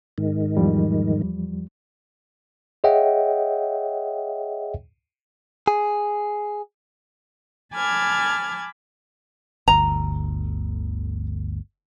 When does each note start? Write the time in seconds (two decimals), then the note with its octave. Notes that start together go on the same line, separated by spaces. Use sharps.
0.18 G#2 D#3
0.57 E2 F3 G3
2.84 G#4 C#5 D#5 E5 F#5 G5
5.68 G#4
7.74 G#5 A5 B5 D6 F6 G#6
9.68 G1 D2 A#5